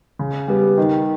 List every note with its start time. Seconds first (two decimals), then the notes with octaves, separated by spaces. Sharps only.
0.19 C#3
0.48 G3 B3 G4
0.78 D#3